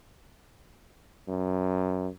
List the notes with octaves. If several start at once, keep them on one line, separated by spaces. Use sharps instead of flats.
F#2